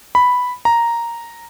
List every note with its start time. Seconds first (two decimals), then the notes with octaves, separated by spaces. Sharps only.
0.15 B5
0.65 A#5